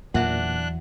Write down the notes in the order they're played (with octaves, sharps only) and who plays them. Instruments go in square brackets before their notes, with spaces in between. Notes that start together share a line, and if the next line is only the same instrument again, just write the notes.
[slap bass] E2 E3 F#3 [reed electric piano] A#2 [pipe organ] D4 F#6 [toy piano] E5 F#5